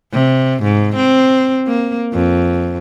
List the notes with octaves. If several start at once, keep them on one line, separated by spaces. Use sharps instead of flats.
C3
G#2
C4
A#3
F2